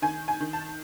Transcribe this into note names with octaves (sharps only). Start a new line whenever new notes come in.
D#3 G#5
G#5
D#3
A5